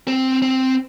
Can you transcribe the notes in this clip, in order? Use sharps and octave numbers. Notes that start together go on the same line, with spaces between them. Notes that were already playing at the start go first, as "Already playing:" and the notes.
C4
C4